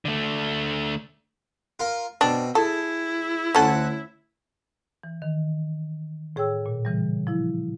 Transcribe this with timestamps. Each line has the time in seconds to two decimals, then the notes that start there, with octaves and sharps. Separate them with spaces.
0.05 D3 A3
1.79 F4 A#4
2.21 B2 C4 D4
2.55 E4 G#4 A4
3.55 D2 C#4 A4 F#5 A5
5.03 E3
5.22 D#3
6.36 A2 G#4 C#5 G5 E6
6.66 A#2
6.85 C#3 E3 G3
7.27 F3 E4